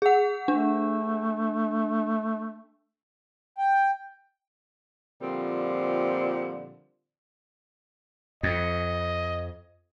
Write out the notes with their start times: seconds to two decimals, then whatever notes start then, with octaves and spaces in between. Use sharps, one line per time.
0.02 G#4 F#5
0.48 A3 D4
3.58 G5
5.21 A#2 D3 F3 G3 C4
8.43 F2 D#5